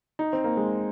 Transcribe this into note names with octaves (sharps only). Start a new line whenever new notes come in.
D#4
C4
A#3
G#3